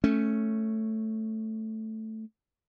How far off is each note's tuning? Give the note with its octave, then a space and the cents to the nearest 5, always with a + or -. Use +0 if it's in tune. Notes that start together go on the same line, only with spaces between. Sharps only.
A3 +0 C#4 +0